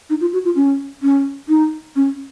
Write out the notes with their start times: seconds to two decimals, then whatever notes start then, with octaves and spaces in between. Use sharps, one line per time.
0.10 D#4
0.21 F4
0.33 F#4
0.45 F4
0.56 C#4
1.02 C#4
1.49 D#4
1.96 C#4